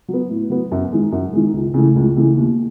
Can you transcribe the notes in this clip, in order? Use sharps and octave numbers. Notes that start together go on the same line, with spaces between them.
F#3
B3
A2
F#3 B3
F#2
D#3 G#3
F#2
D#3 G#3
C#2
C#3 E3 A3
C#2
C#3 E3 A3
D#2